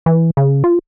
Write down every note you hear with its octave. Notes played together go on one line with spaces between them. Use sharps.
E3
C#3
F4